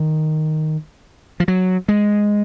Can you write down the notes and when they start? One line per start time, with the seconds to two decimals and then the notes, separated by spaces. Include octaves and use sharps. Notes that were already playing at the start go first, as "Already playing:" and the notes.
Already playing: D#3
1.40 F3
1.48 F#3
1.88 G#3